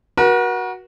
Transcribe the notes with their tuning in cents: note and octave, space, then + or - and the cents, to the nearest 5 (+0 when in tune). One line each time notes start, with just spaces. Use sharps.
F#4 +0 A#4 +45